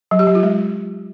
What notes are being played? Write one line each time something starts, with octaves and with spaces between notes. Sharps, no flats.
F#3
G4
F#3
F4
G#3